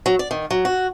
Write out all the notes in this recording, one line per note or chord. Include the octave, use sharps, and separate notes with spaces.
F#3
D5
D#3
F#3
F#4